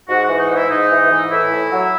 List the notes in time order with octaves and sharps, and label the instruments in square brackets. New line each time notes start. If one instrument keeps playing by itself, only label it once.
[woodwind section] G#2 F#4
E3 F#4
D#4
G#2
E4
G#2 D#4
E3
E3
A2 E4
A2
F#3